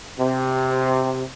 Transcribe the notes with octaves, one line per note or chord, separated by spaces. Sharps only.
C3